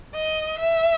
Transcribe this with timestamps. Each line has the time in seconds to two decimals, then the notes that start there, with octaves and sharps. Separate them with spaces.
0.15 D#5
0.59 E5